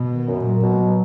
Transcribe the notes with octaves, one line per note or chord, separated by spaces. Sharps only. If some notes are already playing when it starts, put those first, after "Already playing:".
Already playing: B2
D#3
F#2
A#2 F#3
B2
F#3